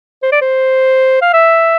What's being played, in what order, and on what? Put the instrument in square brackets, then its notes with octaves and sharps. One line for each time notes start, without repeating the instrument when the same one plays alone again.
[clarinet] C5
D5
C5
F5
E5